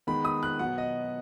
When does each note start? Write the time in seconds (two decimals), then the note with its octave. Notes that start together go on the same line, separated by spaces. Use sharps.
0.07 D#3 G#3 B3 B5
0.25 D#6
0.43 F#6
0.59 B2 F#3 B3 F#5
0.78 D#5